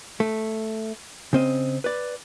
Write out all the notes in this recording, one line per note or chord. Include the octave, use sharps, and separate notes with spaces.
A3
C#3 C4 D#5
B4 D5